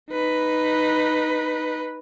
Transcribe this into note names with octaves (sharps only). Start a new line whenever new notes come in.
D#4 B4